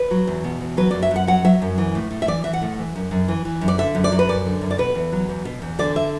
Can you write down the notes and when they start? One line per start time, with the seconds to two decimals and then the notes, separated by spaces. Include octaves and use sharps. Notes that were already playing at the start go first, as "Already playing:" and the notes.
Already playing: B4
0.11 F#3
0.27 E2
0.44 B2
0.61 E2
0.77 F#3 B4
0.91 F#2 D5
1.03 E5
1.11 F#2 F#5
1.27 F#3 F#5
1.44 F#3 E5
1.62 F#2
1.78 E3
1.95 A2
2.11 A2
2.22 E5
2.27 E3 D5
2.44 E3 E5
2.53 F#5
2.62 A2
2.79 E3
2.95 F#2
3.11 F#2
3.28 E3
3.45 E3
3.61 F#2
3.68 D5
3.78 D3 E5
3.95 F#2
4.04 D5
4.12 F#3
4.19 B4
4.29 F#2 D5
4.46 D3
4.61 F#2
4.71 D5
4.78 B2 B4
4.95 E2
5.12 F#3
5.29 E2
5.45 B2
5.62 E2
5.79 D3 D5
5.96 E5